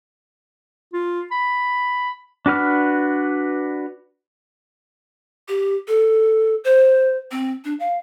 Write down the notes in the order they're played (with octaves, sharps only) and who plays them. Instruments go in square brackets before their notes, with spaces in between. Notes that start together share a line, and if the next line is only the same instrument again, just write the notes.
[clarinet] F4
B5
[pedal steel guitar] D4 F#4 B4 F6
[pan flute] G4
A4
C5
C4
D4
F5